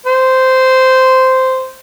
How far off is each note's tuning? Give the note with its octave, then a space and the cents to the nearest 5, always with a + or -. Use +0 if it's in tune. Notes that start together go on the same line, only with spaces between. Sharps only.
C5 -10